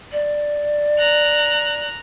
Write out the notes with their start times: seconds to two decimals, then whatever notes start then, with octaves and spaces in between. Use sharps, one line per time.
0.12 D5
0.99 A#5 F#6